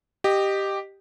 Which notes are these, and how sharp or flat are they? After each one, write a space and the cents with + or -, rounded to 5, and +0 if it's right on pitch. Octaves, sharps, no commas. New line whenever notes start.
G4 +0 D#5 -15